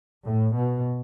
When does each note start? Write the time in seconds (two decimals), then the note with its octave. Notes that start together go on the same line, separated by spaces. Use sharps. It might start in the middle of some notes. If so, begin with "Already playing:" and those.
0.24 A2
0.54 B2